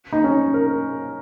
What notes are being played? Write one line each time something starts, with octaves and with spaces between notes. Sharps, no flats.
D#4
C#4
A#4